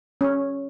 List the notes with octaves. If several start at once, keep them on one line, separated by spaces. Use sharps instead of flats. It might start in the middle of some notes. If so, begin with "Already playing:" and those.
C#4